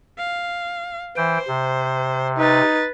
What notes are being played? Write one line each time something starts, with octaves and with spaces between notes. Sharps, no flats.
F5
E3 C5 G5
C3
D#4 B4 A6